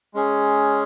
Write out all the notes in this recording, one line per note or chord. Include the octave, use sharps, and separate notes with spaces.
G#3 C#4 G#4